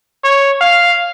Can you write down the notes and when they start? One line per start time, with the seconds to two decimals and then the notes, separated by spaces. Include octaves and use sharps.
0.24 C#5
0.61 F5